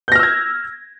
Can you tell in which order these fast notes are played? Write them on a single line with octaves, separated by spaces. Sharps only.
G6 A#6 F6 E6 G#6